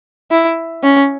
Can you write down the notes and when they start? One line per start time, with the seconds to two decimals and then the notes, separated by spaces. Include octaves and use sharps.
0.31 E4
0.83 C#4